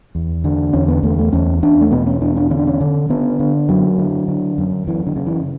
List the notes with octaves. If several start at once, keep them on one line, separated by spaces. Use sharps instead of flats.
E2
D3
E2 C#4
B3
E2 A3
A3
E2 C#4
E2 D4
A3
B2 B3
C#4
E2 D4
D4
D3 C#4
D4
C#4
D3
D3 B3
D3
F#2 F#3
D3
D3
F#2
F#2 E3
D3
C#3
E3